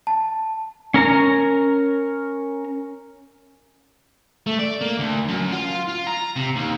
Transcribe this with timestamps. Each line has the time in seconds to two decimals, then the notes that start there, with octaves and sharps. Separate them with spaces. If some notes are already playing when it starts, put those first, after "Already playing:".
0.07 A5
0.94 C#4 A#4 A#5
4.47 A3
4.59 D5
4.81 A#3
4.99 D2
5.28 F#2
5.52 F4
5.89 F4
6.07 A#5
6.36 C3
6.56 D#2